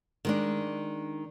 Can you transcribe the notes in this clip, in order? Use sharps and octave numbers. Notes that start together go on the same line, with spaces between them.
D#3 G#3 D4